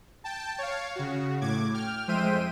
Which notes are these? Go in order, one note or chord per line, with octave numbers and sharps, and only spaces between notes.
G5 A5
C#5 F5
C#3 F#4
A2 D6 G#6
G5 F6
F2 G#3 C5 E5 G5 D#7